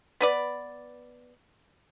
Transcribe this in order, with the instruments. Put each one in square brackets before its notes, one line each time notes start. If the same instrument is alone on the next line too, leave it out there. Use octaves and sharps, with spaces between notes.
[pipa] B3 B4 D5